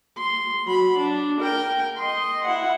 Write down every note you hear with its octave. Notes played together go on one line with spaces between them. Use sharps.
C6
F#3 B5
D4
A#4 G5
D#5 C6
E4 F#5